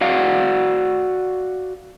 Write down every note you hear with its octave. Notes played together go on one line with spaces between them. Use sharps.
F#4 D5 F5 F#5